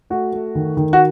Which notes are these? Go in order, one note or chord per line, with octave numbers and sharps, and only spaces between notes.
A3 F#4
A3
D#3
D#3
F#4